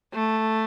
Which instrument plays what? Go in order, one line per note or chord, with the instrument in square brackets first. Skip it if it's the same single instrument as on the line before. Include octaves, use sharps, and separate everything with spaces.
[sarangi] A3